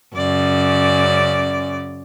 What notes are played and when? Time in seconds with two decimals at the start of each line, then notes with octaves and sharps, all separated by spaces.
0.16 F#2 C#3 D5